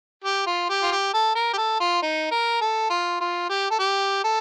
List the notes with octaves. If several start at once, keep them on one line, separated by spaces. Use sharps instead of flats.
G4
F4
G4
F4
G4
A4
A#4
G4
A4
F4
D#4
A#4
A4
F4
F4
G4
A4
G4
A4